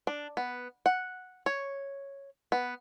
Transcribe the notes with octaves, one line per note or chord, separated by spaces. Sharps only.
D4
B3
F#5
C#5
B3